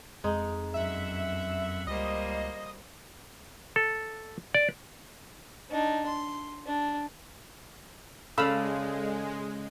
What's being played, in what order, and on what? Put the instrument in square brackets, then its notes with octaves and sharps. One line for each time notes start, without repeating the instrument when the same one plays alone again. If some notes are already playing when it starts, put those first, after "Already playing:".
[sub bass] F2 [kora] G#3 D#4
[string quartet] F#2 F#5 [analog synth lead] E5
[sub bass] C#2 [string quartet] G3 A#3 C5 [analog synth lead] D#5
[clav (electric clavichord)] A4
D5
[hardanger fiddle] D4 D#4
C6
D4
[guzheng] C#3 D5 [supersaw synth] G#3 [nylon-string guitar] A4 [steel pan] F5 B5 E6